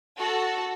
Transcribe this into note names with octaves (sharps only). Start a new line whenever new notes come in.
F#4 A4